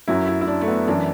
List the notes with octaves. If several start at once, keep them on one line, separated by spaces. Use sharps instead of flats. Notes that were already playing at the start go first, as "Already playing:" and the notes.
F#2 F#3 E4
E4
E4
D4
A3
B3
F#2 E3 D4